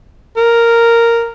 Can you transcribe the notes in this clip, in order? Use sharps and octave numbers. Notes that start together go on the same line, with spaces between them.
A#4